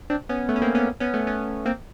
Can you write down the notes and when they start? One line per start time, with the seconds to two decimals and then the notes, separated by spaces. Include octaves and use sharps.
0.10 C4 D4
0.29 B3 C#4
0.49 A3 B3
0.56 C#4
0.62 A#3 C4
0.75 B3 C#4
1.00 B3 C#4
1.14 A3 B3
1.27 B3 C#4
1.65 A#3 C4